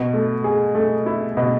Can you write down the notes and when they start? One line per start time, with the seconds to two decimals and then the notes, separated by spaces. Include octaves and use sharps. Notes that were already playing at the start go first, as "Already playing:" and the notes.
Already playing: B2
0.13 A3
0.44 G#4
0.75 A3
1.06 E4
1.37 B2